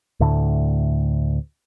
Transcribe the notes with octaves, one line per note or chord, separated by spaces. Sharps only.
D2 A2 D3